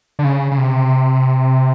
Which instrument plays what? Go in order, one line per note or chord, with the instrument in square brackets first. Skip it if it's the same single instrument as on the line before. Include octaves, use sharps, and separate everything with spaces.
[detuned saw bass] D3
C#3
C#3
C3